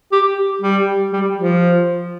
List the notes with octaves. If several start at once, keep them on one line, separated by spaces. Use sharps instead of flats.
G4
G3
G3
F3